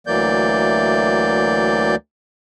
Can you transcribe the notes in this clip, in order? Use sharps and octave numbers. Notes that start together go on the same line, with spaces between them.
D2 E3 F#3 A#3 D5 G6